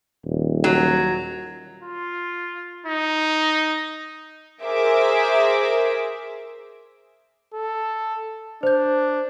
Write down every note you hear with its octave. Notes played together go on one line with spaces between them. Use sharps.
D#1
F#3
F4
D#4
G#4 A#4 C5 E5 D6
A4
D4 C5 G6